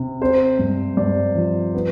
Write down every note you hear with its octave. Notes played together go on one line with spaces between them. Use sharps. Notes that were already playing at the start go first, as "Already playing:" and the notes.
Already playing: C3
C4 C5
G2
G2 D5
F3
B3